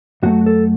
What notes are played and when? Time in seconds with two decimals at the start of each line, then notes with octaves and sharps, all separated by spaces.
0.23 F#2 F#3 A3 F#4
0.46 A4